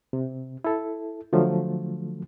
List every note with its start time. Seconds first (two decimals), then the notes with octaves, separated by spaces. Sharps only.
0.13 C3
0.64 E4 A4
1.33 D3 F3 F#3 A3